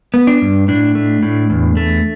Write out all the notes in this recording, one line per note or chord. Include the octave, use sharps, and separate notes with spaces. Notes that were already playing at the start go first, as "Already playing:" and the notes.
B3
D4
G2
A2 D4
A3
A2
E2
A3